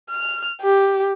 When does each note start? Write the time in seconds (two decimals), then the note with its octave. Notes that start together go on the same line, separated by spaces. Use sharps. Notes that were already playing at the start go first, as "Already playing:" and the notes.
0.10 F6
0.62 G4